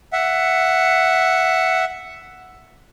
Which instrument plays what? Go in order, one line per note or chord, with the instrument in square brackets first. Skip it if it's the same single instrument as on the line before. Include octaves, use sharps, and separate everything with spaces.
[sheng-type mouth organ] E5 F#5